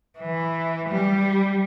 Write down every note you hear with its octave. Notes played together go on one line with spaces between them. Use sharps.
E3
G3